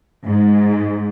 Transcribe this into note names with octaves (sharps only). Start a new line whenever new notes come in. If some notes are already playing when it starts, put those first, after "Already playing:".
G#2